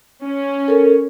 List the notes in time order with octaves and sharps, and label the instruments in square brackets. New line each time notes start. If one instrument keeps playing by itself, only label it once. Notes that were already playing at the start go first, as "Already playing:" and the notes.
[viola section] C#4
[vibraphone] A4 A#4